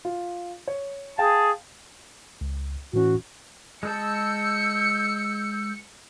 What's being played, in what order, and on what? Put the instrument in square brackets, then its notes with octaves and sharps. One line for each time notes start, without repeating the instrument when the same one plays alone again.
[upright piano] F4
C#5
[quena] G#4 [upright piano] F5 G5 [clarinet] A5
[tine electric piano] C#2
[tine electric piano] A2 E3 C#4 [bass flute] F#4
[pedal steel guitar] G#3 G#4 A5 [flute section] E6 G6 [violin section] C#7